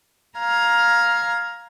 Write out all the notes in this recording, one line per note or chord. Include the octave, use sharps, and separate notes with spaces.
F5 A#5 F6 G#6